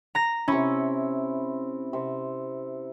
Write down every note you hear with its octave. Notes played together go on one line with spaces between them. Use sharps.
A#5 A#6
C3 C#4 E4
C3